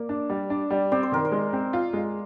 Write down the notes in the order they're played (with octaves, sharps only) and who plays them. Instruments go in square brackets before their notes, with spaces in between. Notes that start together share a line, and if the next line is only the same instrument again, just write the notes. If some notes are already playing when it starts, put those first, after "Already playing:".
Already playing: [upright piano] A#3 [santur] D5
[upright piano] D4
G3
D4
G3
[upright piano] C4 [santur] D5
[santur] C5
[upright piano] D#3 [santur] A#4
[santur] C5
[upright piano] G#3
C4
F4
G#3